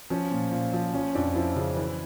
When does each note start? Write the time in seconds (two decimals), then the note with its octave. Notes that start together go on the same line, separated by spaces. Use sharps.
0.10 F3 C#4
0.31 A#2
0.52 A#2
0.73 F3
0.94 F3 C#4
1.15 F2 D4
1.35 F3 E4
1.56 C#3
1.77 E3